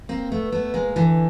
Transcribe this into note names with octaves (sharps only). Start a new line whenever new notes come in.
A#3 C4
A3 B3
A3 B3
G#3 A#3
D3 E3